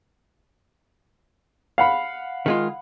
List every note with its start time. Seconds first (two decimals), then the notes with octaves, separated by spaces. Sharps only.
1.78 F5 F#5 B5
2.46 D#3 G#3 F4